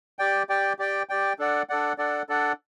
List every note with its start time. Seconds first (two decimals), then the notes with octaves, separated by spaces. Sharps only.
0.19 G4 D5 G5
0.49 G4 D5 G5
0.79 G4 D5 G5
1.09 G4 D5 G5
1.39 D4 A4 D5 F#5
1.69 D4 A4 D5 F#5
1.98 D4 A4 D5 F#5
2.29 D4 A4 D5 F#5